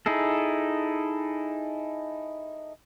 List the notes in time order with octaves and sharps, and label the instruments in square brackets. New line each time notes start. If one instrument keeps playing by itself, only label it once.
[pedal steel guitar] D#4 E4 G#4 A4